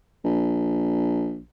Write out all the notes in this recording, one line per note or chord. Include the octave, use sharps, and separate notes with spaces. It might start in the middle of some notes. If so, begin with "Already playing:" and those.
A#1